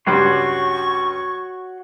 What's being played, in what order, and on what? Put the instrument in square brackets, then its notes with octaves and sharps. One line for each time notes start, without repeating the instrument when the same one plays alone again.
[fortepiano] C#2 G2 G3 [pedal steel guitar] F#4 C#5 C6 [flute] C#6